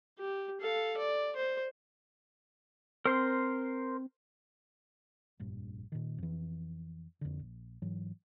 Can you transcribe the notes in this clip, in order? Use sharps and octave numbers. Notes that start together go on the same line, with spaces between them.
G4
A4 F5
D5
C5
C4 A#4 C5 C6
F1 A#1 G2
A#2 D#3
F2 E3
F2 D3
A#1
G#2 E3 F#3